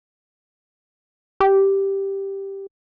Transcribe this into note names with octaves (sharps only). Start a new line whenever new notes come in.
G4